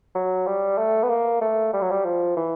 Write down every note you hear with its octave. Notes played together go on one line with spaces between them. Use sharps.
F#3
G3
A3
B3
A#3
A3
G3
F#3
G3
F3
E3